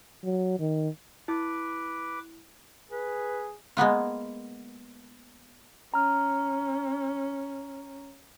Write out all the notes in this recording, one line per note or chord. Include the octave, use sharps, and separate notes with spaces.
F#3
D#3
E4 B4 D6
G#4 B4
G#3 A#3 B3 F4
C#4 A#5 F6